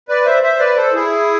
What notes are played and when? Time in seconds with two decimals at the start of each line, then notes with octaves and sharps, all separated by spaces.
0.09 B4 D5
0.25 C5 E5
0.43 C5 E5
0.59 B4 D5
0.76 A4 C5
0.93 E4 G#4